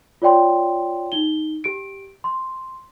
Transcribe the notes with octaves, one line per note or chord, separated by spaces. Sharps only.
F4 C#5 D5 G5 C6
D#4 G7
G4 D7
C6